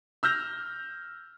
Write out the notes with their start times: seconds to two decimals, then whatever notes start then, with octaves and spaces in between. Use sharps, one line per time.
0.23 E6 F6 G6 A#6 F7